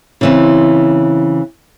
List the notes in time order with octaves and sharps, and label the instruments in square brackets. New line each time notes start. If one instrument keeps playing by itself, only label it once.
[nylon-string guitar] C#3 E3 C4